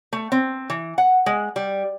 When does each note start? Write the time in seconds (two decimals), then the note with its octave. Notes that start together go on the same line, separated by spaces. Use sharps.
0.13 A3
0.32 C4
0.70 E3
0.98 F#5
1.26 G#3
1.56 G3